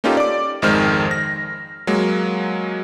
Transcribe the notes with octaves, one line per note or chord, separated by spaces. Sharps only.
A#3 C#4 D#4 F4 G4 A4
D5 D6
G#1 F2 D#3 G#3 C5 F6
A#6
F#3 G#3 A#3